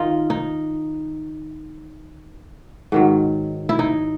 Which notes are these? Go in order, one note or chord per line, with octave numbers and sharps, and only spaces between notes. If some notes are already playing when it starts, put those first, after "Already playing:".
Already playing: D#3 G3 D#4 F4
D#4
G#2 D#3 F#3
E4
D#4